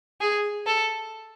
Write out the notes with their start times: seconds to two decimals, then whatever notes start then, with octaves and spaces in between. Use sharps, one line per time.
0.21 G#4
0.66 A4